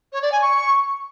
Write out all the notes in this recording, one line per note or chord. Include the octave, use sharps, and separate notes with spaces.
C#5
D5
G#5
C#6